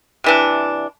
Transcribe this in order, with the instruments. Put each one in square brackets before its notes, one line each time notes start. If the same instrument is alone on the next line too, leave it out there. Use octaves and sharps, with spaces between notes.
[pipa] C3 E3 D4